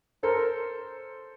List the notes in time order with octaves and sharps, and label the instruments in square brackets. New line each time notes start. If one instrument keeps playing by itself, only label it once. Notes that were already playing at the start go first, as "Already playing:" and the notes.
[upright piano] A4 C5 [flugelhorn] A#4